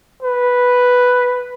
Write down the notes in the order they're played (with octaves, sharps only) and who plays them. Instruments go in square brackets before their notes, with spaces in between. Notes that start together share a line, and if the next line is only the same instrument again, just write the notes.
[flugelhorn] B4